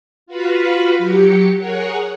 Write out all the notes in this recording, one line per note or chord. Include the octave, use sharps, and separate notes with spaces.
F4 F#4 B4 F5 B5
F#3 G4 C#7
G#4 A#4 C#5 F#5